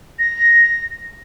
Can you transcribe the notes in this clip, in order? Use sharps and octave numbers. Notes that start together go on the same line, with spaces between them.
A#6